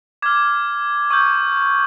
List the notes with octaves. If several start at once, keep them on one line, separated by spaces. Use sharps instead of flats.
D6 F6 G#6
C#6 E6 G6